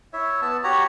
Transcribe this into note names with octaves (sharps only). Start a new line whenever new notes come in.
E4 C#5 E5
B3 A5 E6
F#4 G4 C#5 A#5